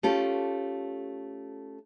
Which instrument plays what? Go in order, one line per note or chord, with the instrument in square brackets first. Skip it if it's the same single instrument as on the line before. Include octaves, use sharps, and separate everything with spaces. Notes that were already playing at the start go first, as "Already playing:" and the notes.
[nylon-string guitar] A3 C#4 F4 G4 A4